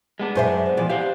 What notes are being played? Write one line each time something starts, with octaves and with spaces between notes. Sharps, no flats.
G#3 B3 D4
F#2 C5 E5
E3 F3 D5
G4 C5 F5 F#5